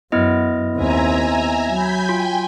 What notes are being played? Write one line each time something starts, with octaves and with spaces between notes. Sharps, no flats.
F#2 B3 E4 D#5
D#2 C4 E5 G#5 A#5
F#3 G#5 B5 G6
F4 G5 G#5